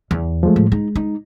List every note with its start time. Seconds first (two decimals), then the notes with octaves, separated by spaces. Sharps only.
0.11 E2
0.43 F3 G#3 A3
0.56 A2
0.72 G#3 D#4
0.96 D#4